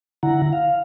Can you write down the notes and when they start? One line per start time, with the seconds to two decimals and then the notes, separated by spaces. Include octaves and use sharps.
0.23 D3 E4 F#5 A#5
0.53 F5